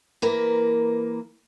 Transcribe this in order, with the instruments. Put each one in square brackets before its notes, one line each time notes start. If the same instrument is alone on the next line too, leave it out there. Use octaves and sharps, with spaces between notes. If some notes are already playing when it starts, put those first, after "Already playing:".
[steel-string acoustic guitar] E3 A#3 A#4 B4